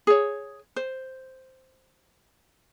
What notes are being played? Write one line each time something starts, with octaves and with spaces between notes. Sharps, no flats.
G#4 C#5
C5